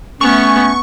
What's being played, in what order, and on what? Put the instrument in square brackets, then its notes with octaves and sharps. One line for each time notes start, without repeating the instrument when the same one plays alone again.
[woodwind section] A3 C#4 [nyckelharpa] B3 [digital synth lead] C#6